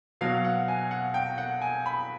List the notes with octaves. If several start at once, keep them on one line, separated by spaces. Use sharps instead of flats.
B2 F#3 F5
F#5
G#5
F#5
G5
F#5
G#5
B5